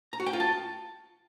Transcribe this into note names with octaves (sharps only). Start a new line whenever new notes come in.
A#5
F#4
G5
F4
A5